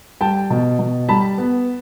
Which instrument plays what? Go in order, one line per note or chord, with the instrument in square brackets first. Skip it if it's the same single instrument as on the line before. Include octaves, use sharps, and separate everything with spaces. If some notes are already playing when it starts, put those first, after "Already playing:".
[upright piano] G3 G5 A5
B2
B2
G3 A5 B5
B3